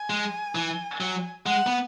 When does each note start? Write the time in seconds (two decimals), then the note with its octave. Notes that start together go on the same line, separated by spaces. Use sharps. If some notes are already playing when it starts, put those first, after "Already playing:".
Already playing: G#5
0.10 G#3
0.55 E3
1.01 F#3
1.46 G#3 F#5
1.67 B3